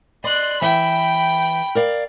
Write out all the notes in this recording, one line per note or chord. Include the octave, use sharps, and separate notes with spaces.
D5 D#5 C6 F#6
E3 E5 G5 B5
A#4 D5 F5